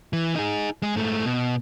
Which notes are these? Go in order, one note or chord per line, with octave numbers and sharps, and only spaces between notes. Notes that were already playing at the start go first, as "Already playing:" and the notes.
E3
D#4 G#4
G#3 G#4
G#2 A3
B2